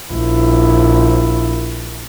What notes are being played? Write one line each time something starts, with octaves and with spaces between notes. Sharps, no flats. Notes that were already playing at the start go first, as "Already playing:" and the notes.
A#1 E4